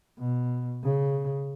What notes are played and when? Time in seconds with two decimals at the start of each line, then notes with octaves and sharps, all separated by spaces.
0.19 B2
0.84 C#3